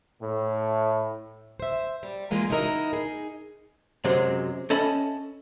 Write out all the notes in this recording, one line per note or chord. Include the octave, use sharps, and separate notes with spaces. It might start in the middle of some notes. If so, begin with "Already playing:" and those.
A2
C5 E5
G3
E3 G#3 A#3 F4 G#4
D#4 E4 F#4 A#4 C5 D#5
D#4 G#4
F#2 C3 F#3 G#3
C#4 A4 D#5 E5 B5